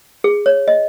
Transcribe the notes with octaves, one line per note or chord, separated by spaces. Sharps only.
G#4
C#5
D#5